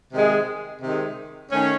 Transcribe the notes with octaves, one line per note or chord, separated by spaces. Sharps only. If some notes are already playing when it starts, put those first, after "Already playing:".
C3 D#3 G#3
C3 D#3 G#3
D#3 A3 C#4